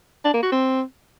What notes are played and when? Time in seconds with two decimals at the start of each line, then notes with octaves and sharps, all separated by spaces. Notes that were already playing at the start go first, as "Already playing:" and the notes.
0.25 D4
0.34 A#3
0.43 F#4
0.52 C4